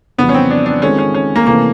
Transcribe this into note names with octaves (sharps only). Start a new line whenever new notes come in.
F2 C#3 E3 G3 B3
C#4
C4
D4
D4
D#3 G#3 C4 C#4 F4 A4
C#4
C#4
A#3
C3 E3 A3 A#3 C#4